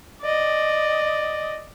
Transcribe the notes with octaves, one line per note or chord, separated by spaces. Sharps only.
D5 D#5